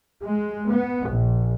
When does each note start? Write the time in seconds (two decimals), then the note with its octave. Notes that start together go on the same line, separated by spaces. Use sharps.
0.24 G#3
0.70 B3
1.09 A#1